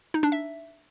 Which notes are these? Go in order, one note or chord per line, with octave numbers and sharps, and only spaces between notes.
D#4
D4
E5